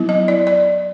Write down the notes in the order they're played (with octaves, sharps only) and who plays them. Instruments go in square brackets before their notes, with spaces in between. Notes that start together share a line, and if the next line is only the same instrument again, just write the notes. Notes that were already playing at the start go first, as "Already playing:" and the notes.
Already playing: [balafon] F#3 B3 E4
D#5
D5
D5